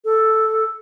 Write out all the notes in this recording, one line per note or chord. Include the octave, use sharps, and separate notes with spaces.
A4